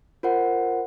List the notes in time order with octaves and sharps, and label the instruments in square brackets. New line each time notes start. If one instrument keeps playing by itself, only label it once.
[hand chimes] F4 A#4 C5 F#5